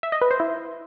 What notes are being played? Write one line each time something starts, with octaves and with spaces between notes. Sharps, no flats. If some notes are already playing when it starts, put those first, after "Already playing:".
E5
D#5
B4
C5
E4